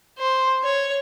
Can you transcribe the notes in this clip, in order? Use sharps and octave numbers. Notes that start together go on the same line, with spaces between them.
C5
C#5